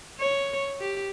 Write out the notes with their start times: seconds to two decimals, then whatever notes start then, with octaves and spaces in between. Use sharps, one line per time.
0.20 C#5
0.80 G4